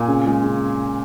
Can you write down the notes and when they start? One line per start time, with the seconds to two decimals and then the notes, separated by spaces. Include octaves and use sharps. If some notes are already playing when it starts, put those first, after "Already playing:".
Already playing: A#2 G#5
0.08 C#3
0.27 G#3
0.44 C#3